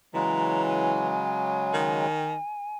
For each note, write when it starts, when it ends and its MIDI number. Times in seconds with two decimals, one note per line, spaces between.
0.14 2.06 49
0.14 1.27 52
0.14 2.06 54
0.14 2.06 56
0.14 0.65 82
0.66 2.78 80
1.73 2.38 51